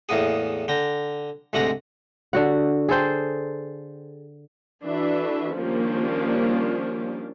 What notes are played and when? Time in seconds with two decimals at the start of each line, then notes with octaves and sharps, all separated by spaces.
0.09 E2 A2 A#3 B3 G#4
0.68 D3 G5 A#5
1.53 D2 G#2 C3 A3 F#5 A#5
2.33 D3 F#4 F#5
2.88 G#4 A4 C5 G5
4.86 E3 D4 F#4 A4 B4 E5
5.55 D#3 F3 G3 A#3 C#4 D4